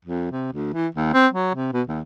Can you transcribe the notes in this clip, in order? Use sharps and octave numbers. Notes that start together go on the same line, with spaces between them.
F2
C3
D2
E3
D#2
C4
F#3
C3
B2
D#2